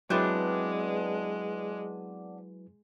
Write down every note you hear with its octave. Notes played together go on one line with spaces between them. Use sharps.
F#3 G#3 B3 C4 D4 E4 B4